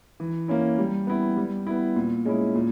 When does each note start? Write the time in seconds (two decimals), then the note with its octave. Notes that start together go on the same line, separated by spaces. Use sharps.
0.20 E3
0.48 A#3 C#4 E4
0.78 G3
1.07 B3 E4
1.37 G3
1.67 B3 E4
1.96 A#2
2.25 G#3 C#4 E4
2.55 A#2